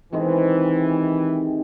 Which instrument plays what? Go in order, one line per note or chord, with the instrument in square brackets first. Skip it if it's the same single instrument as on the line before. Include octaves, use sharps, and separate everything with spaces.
[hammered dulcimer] C3 D#3 G#3 [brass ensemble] E3